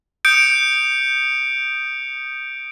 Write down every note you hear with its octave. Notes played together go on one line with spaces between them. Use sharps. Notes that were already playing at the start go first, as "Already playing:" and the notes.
D#6 G6 C#7 D7